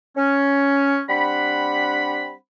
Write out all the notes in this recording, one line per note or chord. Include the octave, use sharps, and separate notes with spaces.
C#4
G3 C4 D4 F#5 B5